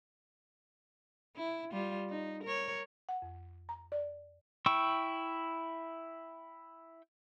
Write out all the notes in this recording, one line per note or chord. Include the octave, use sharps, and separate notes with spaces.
E4
G3 F4
D#4
A#4 C#5
F#5
F2
A#5
D5
E4 G5 C#6 E6